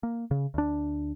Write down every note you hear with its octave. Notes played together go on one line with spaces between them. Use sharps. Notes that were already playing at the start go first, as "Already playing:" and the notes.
A#3
C#3
D2 D4